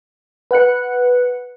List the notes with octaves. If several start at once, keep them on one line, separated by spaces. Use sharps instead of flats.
B4 F#5 F#6 C#7